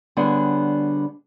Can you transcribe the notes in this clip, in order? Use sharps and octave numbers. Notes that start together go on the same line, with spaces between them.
D3 G3 B3 D4 G#4 C#5